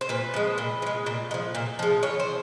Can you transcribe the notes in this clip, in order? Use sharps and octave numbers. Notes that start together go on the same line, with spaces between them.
C5
A#2 B4
F3 G#3
A#2
F3
G#3
A#2
G#3
F3
A#2
F3 G#3
E3 C#5
C5